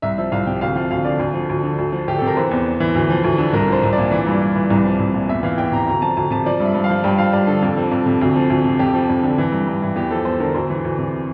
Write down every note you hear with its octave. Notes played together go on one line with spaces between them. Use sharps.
C2 E5
F3 E5
C2 F5
C3 G5
D2 F5
F3 F5
D2 F5
D3 D5
D2
F3
D2
D3
D2
F3
D2 G4
C3 A4
A#4
E3 C5
E2
E2
E3
D2
F3
D2
D3
C2 A#4
F3 C5
C2
D5
A#2
E3
G2
G2
E3
C2
F3
C2
A#2
E2 E5
E3 F5
E2 G5
C3 A#5
D2 A#5
F3 A5
D2 A5
C3 A5
F3 D5
G2
E5
G2
F5
F3
G2 G5
F3 F5
G2 D5
D3 A4
F2
F3
F2
C3
D2
F3
D2
C3
F2 G4
F3
F2
D3
E3
G2
G2
E3
E2 G4
F3 A4
E2 C5
D3 A#4
D2 C5
E3
D2
C3